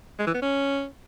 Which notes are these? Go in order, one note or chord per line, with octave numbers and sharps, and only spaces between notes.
G#3
E3
B3
C#4